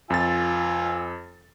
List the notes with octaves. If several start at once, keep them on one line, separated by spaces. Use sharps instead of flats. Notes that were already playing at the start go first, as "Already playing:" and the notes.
F2 F4 G#5 E6 A6